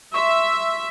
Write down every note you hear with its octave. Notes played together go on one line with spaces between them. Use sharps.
E5 C6 C#6